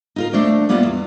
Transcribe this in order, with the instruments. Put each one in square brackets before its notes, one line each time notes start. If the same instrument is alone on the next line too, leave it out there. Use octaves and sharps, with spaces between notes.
[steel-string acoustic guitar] D#4 F4 A#4
D#2 A3 D4 C5 D5
G3 A#3 B3 E4 F4 D5
E2